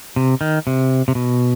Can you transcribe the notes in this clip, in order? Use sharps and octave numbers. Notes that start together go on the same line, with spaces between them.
C3
D#3
C3
C3
B2